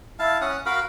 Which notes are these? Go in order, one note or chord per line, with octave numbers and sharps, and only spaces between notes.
E4 F5 A5
C#4 F#5 D#6
F#4 A#4 F5 B5